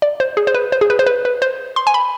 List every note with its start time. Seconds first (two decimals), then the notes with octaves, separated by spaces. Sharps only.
0.02 D5
0.20 C5
0.37 G#4
0.47 C5
0.54 B4
0.72 C5
0.81 G#4
0.90 B4
0.99 C5
1.07 B4
1.25 B4
1.42 C5
1.76 C6
1.87 G#5
1.94 B5